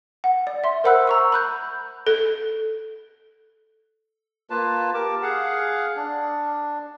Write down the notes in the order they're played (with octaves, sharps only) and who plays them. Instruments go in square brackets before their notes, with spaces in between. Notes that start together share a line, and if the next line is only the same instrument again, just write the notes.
[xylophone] F#5
D5
E5 C6
A#4 C5 F#5 B5 E6 F#6
A#5 C#6 E6
B5 F#6 G6
[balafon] A4
[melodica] A#3 F4 B4 A5
G4 A#4 A5 D6
G#4 F5 F#5
D4